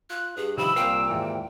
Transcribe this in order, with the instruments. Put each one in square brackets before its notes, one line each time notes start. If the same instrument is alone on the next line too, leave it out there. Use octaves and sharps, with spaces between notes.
[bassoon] F4 [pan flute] F#6
[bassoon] G2 [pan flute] G#4
[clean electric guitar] C3 D#3 F3 [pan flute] B5 [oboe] E6
[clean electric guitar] C2 C4 F5 [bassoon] A#2 [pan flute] G5
[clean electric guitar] D#2 G#2 E3